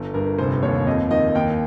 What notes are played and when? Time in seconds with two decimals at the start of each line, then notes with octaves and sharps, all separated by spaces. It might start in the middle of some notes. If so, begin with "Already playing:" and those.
Already playing: G1
0.14 G2 A#4
0.38 F1 C5
0.63 D#2 C#5
0.87 F2 D#5
1.11 D#3 D#5
1.35 D#2 G5